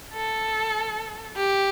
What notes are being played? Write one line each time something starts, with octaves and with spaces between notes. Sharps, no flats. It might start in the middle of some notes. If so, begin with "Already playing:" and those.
A4
G4